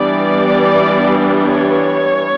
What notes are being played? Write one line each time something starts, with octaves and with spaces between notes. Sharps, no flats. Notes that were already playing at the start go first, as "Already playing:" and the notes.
Already playing: E3 G3 B3 D4 D5
C#5